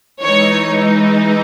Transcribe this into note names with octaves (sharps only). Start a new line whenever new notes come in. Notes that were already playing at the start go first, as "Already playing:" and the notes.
E3 G#3 D#4 C#5